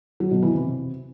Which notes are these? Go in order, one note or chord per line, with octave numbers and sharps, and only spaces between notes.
F#3
B2
E3
C3